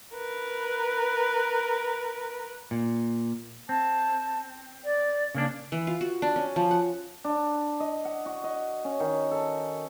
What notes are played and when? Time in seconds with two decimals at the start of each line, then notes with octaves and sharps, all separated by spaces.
0.15 A#4 B4
2.71 A#2
3.69 C4 A5
4.85 D5
5.35 C#3 A#3 D4
5.72 E3
5.87 F4
6.01 F#4
6.22 D4
6.36 C#4
6.56 F3
6.71 F#5
7.24 D4
7.80 D#5
8.05 F#5
8.26 F#4
8.44 D#5
8.85 C#4
9.00 D#3
9.31 A4